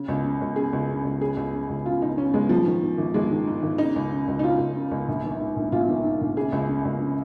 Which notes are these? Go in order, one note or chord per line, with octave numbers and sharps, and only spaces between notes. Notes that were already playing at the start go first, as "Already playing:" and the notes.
Already playing: C#3
C#2
C#3
C#2
C#3 G#4
C#2
C#3
C#2
C#3 G#4
C#2
C#3
C#2
C#3 F4
C#2 D#4
C#3 C#4
C#2 G#3
G#1 F3
D#3
G#2
G#1
G#1 G#3
D#3
G#2
G#1
C#3 D#4
C#2
C#3
C#2
D#4
C#3 F4
C#2
C#3
C#2
A#1
D#3
G#2
A#1
A#1 F4
D#3
G#2
A#1
C#3 G#4
C#2
C#3
C#2
C#3